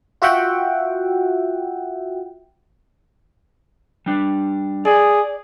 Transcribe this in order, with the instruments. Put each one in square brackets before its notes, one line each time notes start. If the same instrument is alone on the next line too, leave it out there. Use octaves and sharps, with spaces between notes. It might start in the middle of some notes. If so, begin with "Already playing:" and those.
[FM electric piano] F4 F#4 E5 F#5 G5
[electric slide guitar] G3 D4
[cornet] G#4 [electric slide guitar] D5